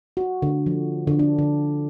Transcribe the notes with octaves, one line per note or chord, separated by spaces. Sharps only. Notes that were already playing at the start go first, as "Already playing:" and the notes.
F#4
D3
F3
D3
D4
D3